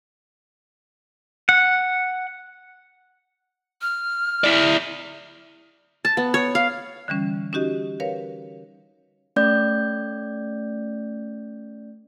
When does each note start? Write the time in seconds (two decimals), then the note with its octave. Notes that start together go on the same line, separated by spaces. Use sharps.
1.49 F#5
3.82 F6
4.44 E4 D5
6.05 A5
6.17 B3
6.34 C#5
6.55 F5
7.08 D3 E3 G3 C#4
7.53 C#4 D#4 F#4 G4 D#5
8.00 A#4 B4 C#5 F5
9.36 A3 C#4 D5 G6